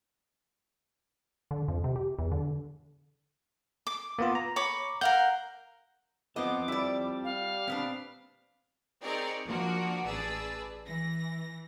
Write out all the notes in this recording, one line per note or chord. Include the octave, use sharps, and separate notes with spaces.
D3
F2
C3
G4
E2
D3
D6
A#3 B3 F4
A#5
C#5 B5 D6
A#4 F5 F#5 G6
B3 C4 F4 A4 C5 D#5 D6
G3 E4 D5
F5
A#2 B3 C4 D4
C4 D#4 G#4 A#4 C#5 D5
F3 A#3 D4 F#4 A#4
A1 G#4 B4 D5 A5 E6
E3 A#6